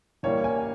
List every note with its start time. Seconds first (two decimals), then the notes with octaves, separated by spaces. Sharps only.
0.23 E3 G3 A#3 C#5
0.44 G#5